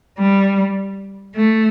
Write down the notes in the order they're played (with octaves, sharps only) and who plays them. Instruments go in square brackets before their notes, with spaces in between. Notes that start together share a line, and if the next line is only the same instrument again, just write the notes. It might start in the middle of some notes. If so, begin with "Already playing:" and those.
[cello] G3
A3